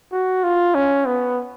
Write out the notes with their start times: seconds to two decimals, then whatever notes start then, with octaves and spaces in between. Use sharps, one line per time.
0.12 F#4
0.44 F4
0.75 C#4
1.07 B3